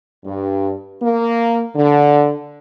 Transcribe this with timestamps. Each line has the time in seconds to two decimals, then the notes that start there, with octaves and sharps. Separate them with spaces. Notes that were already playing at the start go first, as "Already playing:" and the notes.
0.25 G2
1.02 A#3
1.76 D3